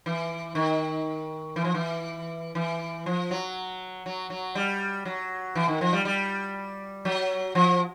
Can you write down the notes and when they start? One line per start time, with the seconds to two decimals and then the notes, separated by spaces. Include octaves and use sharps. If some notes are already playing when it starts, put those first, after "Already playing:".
0.06 E3
0.55 D#3
1.56 E3
1.65 F3
1.74 E3
2.55 E3
3.06 F3
3.31 F#3
4.06 F#3
4.30 F#3
4.55 G3
5.05 F#3
5.55 E3
5.68 D#3
5.81 F3
5.93 G3
6.05 G3
7.05 F#3
7.55 F3